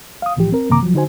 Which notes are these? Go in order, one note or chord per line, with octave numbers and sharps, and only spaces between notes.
F5 D#6
C2 A2 E3 F3 G4
C4 A#4
F#2 C3 D#3 A#3 A#5 D6
C2 F3 F#3
D3 D#4 F#4 C5 G#5